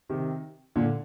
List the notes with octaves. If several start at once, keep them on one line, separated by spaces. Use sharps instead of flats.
C3 D#3
A#2 D3